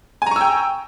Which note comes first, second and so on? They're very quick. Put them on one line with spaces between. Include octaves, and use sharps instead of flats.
G#5 A#5 C#6 E6 G5